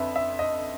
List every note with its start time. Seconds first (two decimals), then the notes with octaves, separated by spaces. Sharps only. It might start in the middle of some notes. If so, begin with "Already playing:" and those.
Already playing: F2 D3 B4 E5
0.16 E5
0.39 D#5